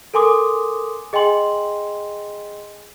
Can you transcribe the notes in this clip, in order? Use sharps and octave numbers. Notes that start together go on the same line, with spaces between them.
A4 A#4 G#5 C6 D6 D#6
G#4 D#5 G5 G#5 C6 F#7